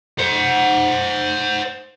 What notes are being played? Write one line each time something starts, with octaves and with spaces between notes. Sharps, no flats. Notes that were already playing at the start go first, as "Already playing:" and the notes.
C5 F#5